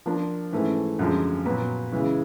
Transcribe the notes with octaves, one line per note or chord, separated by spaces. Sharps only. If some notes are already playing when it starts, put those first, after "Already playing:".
F3 A#3 D4
G#2 E3 A3 C#4
F#2 D3 F3 G#3
A#2 F#3 B3
C#3 E3 G#3